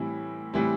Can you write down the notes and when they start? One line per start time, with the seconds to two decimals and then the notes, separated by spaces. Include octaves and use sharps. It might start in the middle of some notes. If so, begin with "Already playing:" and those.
Already playing: A2 E3 G3 C4 E4
0.53 A2 E3 G3 C4 E4